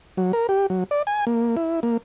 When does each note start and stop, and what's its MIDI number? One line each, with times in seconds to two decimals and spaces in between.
0.17 0.32 54
0.33 0.47 70
0.49 0.66 67
0.70 0.84 54
0.91 1.02 74
1.07 1.25 80
1.27 1.56 58
1.57 1.80 64
1.83 1.97 58